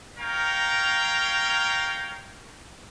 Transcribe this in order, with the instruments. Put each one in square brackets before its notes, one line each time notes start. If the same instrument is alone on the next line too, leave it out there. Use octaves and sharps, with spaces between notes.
[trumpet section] A#4 C#5 F5 G5 A#5